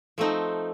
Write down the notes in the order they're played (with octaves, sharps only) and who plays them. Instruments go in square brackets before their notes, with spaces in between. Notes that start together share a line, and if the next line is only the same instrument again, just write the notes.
[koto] F3 A3 C4 D#4